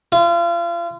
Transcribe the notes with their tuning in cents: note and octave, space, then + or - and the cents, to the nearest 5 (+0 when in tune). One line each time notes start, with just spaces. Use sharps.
F4 -35